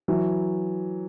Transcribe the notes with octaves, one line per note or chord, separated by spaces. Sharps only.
E3 F#3